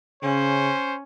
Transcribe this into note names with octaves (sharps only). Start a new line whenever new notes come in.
C#3 C#4 C5